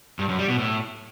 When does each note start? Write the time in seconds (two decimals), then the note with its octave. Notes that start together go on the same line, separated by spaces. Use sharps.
0.19 G2
0.29 F#2
0.39 G3
0.49 B2
0.59 A2